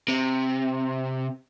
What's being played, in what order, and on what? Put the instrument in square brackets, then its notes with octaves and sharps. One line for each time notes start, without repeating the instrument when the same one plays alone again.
[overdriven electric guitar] C3